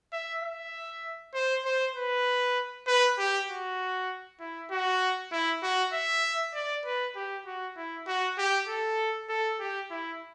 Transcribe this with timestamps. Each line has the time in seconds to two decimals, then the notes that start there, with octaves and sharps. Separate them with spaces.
0.12 E5
0.43 E5
1.34 C5
1.65 C5
1.95 B4
2.87 B4
3.18 G4
3.48 F#4
4.40 E4
4.71 F#4
5.32 E4
5.63 F#4
5.93 E5
6.54 D5
6.85 B4
7.16 G4
7.46 F#4
7.77 E4
8.07 F#4
8.38 G4
8.68 A4
9.29 A4
9.60 G4
9.91 E4